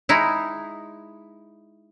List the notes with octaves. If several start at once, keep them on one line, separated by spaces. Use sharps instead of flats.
G#3 D#4 E4